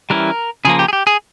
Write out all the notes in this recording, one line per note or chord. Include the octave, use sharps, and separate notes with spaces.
E3 G3 C#4 E4 A#4
C#3 F3 A#3 G#4
G4
G#4
G4
G#4